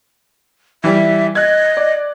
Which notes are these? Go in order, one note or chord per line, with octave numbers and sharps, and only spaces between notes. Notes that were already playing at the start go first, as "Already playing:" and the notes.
E3 G3 E5
D#5 F#6 G#6
D5